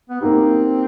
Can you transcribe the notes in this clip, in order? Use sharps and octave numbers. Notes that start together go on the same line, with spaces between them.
B3
A#3 C4 D#4 G4